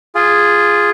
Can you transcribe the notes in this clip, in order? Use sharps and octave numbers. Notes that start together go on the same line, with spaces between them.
F4 G#4